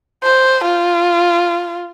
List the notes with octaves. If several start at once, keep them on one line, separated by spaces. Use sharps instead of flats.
C5
F4